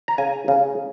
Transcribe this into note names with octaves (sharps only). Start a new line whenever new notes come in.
A#5
C#3 G#5
C#3